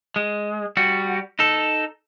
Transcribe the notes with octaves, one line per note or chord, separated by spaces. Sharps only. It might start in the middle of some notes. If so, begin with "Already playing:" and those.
G#3
G3 F#4
D#4 A4